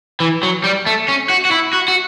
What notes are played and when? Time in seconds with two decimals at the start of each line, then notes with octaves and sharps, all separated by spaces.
0.20 E3
0.43 F#3
0.64 G3
0.86 A3
1.08 C#4
1.30 F#4
1.45 F#4
1.51 E4
1.73 F#4
1.88 F#4